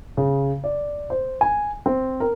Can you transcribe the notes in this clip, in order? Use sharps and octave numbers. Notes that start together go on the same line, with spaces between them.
C#3
D5
C5
G#5
C4
A#4